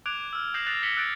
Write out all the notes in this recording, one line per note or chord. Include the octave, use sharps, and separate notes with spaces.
D6 F#6 G#6 D7 F7
E6 F6
D#6 G6 A#6 C7 E7 F#7
F#6 A6 A#6 C7 E7 F7
E6 A#6 B6 C#7 F#7 G7
E6 F#6 G6 A6 D7